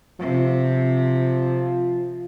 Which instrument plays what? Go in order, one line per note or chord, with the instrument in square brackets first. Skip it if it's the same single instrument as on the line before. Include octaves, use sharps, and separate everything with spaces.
[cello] C3 [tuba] F3